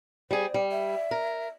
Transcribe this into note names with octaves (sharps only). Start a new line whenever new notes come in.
G3 G#4 C5
G3
E5
A#4